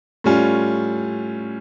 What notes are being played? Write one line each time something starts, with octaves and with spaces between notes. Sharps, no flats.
A2 G3 C#4 F4